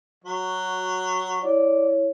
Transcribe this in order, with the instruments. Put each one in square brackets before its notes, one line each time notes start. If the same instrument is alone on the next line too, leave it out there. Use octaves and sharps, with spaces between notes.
[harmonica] F#3 [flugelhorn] F#4
[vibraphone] E4 C#5 [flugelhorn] D5